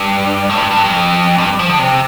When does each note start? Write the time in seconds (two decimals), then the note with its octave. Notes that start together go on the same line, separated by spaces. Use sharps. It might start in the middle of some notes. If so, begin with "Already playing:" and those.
Already playing: G2
0.49 A2
0.58 G2
0.71 G2
0.84 F2
1.38 G2
1.59 F3
1.69 D3
1.79 C3